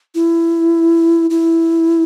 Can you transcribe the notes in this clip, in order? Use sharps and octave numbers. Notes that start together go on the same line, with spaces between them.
E4
E4